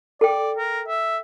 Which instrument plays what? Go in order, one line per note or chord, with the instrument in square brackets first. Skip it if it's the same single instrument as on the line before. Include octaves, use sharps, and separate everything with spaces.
[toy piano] A4 G5 [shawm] D5
[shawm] A#4
E5